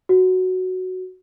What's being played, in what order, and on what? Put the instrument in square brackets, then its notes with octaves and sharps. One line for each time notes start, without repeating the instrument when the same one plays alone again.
[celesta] F#4